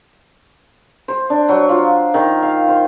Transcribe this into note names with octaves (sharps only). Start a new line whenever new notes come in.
C5
D4
F#3
F4
D#3
F5
C5